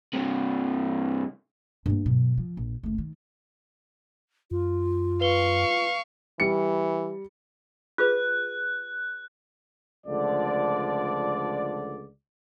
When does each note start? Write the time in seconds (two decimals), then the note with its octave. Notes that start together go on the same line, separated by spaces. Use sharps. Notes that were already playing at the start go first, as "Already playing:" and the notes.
0.13 G2 C3
1.86 G2 A#3
2.06 B2 F#3
2.38 F3
2.57 A#1
2.83 F#1 A3
2.98 D#3
4.51 F#2 F4
5.21 B4 F5 C#6 G7
6.40 E3 G3 C#7
7.98 F4 G#4 B4 F#6
10.07 C#2 D3 F3 A3 D5